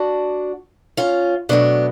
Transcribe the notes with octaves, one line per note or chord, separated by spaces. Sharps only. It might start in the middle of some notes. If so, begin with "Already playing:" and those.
Already playing: D4 F#4
C#4 F4
B2 F#3 A3 B3 D4